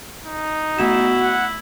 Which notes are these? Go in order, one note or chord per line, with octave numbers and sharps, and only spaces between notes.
D#4
A3 B3 E4 F#4 E7
F#5